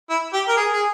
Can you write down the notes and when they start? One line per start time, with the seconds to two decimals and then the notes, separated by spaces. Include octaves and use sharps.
0.10 E4
0.33 G4
0.48 A#4
0.57 G#4
0.73 G#4